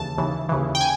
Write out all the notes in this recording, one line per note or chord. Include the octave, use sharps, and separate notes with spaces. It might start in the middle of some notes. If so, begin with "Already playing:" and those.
Already playing: D#2 C#3 E3 A5
D#2 C#3 E3
D#2 C#3 E3
G5
G#5